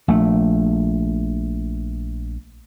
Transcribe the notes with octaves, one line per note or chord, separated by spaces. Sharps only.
A#1 A3